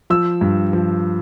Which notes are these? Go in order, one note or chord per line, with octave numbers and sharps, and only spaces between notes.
F3 E6
G2
F3